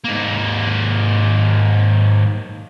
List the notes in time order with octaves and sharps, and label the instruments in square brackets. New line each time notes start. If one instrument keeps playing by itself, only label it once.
[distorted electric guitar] G#2 A#3